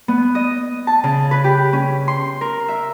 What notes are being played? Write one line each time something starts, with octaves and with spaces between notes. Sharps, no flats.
B3
D#5
A5
C#3
B4
G4
C#4
C6
A#4
E5